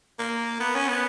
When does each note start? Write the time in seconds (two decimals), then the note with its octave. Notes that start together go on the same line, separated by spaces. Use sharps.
0.19 A#3
0.60 B3
0.75 C#4
0.88 B3